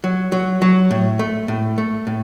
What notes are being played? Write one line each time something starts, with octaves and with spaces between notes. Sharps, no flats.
F#3
F#3
F#3
A2
A3
A2
A3
A2